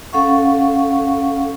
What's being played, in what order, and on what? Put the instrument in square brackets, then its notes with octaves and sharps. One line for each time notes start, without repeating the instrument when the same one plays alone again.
[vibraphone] C#4 A4 F5 F#5 C#6